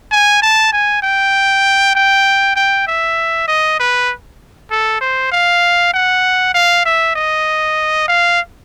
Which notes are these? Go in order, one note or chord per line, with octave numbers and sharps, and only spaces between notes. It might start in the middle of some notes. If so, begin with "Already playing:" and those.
G#5
A5
G#5
G5
G5
G5
E5
D#5
B4
A4
C5
F5
F#5
F5
E5
D#5
F5